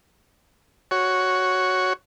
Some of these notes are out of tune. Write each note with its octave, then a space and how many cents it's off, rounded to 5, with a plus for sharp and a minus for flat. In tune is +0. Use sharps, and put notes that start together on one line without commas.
F#4 +0 C#5 +0